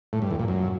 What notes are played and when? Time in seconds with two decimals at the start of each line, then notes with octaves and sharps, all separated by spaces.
0.13 A2
0.22 G2
0.31 E2
0.39 A#2
0.48 F#2